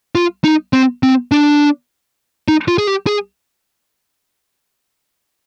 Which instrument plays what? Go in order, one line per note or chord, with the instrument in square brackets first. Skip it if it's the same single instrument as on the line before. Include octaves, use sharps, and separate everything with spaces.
[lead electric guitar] F4
D#4
C4
C4
D4
D#4
F4
G#4
G4
G#4